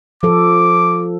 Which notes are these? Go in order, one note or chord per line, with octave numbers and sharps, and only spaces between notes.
F3 A4 D6